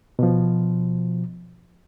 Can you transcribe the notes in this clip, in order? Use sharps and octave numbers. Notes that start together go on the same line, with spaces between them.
B2 F3